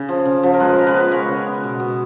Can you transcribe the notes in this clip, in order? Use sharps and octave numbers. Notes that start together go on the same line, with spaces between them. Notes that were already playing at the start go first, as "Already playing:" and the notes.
Already playing: C#3
F3
C#3
F3
A#4
G#3 G#4 B4
C#3 A#4
G#4 B4
B3
G#3 A#4 C#5
C#3
B3
B2
B2